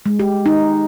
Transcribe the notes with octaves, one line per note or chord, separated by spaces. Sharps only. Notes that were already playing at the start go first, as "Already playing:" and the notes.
G#3
G4
D#4